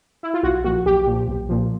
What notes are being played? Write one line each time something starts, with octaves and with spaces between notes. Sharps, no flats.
E4
F4
B1 F#4
A#2 F3 F#4
B1 G4
A#2 F3
B1
A#2 F3